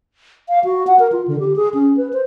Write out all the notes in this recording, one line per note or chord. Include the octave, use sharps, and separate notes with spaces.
F5
F#4
F#5
A#4
F4
D3
G4
G#4
C#4
B4
C5